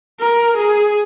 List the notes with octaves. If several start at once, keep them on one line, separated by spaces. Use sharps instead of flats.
A#4
G#4